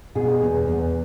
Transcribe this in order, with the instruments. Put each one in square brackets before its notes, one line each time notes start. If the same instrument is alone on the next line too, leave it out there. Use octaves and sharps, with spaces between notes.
[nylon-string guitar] B2 G#4
E2
E2